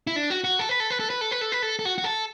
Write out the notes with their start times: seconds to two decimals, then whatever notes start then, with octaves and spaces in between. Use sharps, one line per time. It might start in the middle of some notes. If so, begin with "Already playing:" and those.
0.07 E4
0.16 D4
0.30 F#4
0.44 F#4
0.59 A4
0.69 B4
0.80 A4
0.90 B4
1.00 A4
1.10 B4
1.21 A4
1.31 B4
1.41 A4
1.52 B4
1.62 A4
1.79 A4
1.85 F#4
1.98 F#4
2.04 A4